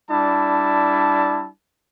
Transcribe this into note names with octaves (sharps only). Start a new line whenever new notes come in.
G3 D4 E4 A5